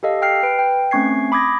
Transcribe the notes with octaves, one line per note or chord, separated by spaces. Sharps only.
G4 A4 D#5 F5
G5 F6 C7
B4 D7
G5
A3 C4 C#4 C#6 G#6 C7
B5 D6 D#6 G#6 A#6